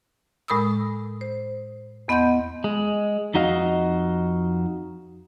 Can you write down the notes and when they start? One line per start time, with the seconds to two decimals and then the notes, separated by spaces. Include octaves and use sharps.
0.48 A2 G#3 A#4 B5 D#6 E6
1.21 C5
2.08 E2 B3 D#5 F#5 C6 G6
2.64 G#3
3.34 F2 D#4 F#4 D#5 F5